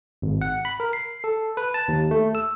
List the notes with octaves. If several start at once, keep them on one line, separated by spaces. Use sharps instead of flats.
G#1
F#5
B5
A#4
C7
A4
B4
A5
D#2
A3
E6